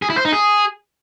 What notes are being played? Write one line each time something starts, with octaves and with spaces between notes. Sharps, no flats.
G#4
E4
C5
D#4
G#4